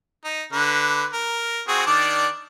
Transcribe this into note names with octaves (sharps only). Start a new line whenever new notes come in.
D#4
D3 B4
A#4
C4 F#4 G#4
D#3 D4 D5